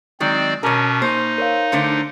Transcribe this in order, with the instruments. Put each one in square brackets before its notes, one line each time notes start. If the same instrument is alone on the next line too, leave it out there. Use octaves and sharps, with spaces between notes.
[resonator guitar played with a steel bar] D#3 F#3 G#3 [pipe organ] C4 D5
[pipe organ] B2 C#4 [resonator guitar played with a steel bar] A#4 C#5 [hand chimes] A5 D6
[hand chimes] A#3 C#6 [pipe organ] D#4 [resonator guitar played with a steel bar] C5
[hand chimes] A#4 C#5 F5
[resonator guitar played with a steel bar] D3 A3 C5 [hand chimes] C#7 D7